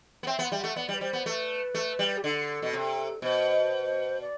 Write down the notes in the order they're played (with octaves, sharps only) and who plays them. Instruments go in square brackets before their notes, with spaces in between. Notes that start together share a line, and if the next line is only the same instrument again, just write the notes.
[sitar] B3
[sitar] C4 [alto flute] E5
[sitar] B3
[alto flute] F#5
[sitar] G3 [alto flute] E5
[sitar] A3 [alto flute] F#5
[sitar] B3 [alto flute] D5
[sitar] G3
[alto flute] B4
[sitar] G3 [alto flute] C5
[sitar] B3
[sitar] A3 [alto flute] B4
[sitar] A3
G3
[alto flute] G4
[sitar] D3 [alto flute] A4
[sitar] B2
C3
[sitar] B2 [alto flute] C5
[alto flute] D5